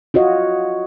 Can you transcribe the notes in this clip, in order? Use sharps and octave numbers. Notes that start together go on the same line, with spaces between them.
F4 F#4 C#5 D#5